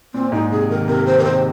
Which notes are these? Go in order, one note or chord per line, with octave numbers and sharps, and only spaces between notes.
A#2 C4
G#2 D#4
C3 G#4
D#3 A#4
C3 A#4
D#3 C5
A#4
C3 C5